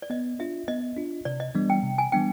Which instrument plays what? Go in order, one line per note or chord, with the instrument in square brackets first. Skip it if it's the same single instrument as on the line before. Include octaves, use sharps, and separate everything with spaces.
[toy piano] D5
[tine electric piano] B3 [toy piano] D#5
[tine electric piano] D4 F4 [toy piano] E5
[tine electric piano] B3 [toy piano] D#5
[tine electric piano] D4 F4
[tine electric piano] C3 [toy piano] D5
[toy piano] D#5
[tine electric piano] E3 G3 B3 D4
[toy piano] G5
[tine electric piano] C3
[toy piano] G#5
[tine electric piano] E3 G3 B3 D4 [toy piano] G5